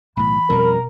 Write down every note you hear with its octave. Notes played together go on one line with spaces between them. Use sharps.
B1 A2 E3 B5
F2 B2 G3 C#4 A#4